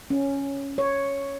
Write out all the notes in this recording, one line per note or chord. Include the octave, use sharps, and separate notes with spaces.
C#4
C#5